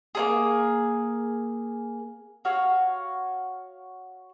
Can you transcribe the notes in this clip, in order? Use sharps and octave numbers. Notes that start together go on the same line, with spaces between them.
A#3 C#4 G#4
F#4 C#5 F5